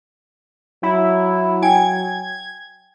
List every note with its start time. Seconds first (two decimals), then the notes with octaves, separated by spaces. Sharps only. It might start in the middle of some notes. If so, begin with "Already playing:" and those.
0.83 F#3 E4
1.62 G5 G#5 G#6